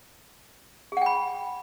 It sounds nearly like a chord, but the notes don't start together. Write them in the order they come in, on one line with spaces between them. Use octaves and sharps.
G#4 F#5 G5 B5